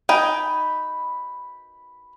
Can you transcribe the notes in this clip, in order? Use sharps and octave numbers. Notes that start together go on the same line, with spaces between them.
D#4 G5 G#5 B5